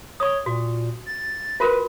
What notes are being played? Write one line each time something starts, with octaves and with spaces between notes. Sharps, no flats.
C#5 C#6 D#6
A#2 F#4
A6
F4 F#4 A#4 B4